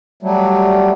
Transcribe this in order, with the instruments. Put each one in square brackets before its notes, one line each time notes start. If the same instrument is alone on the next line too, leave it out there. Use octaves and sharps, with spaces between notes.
[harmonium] F#3 G3 A3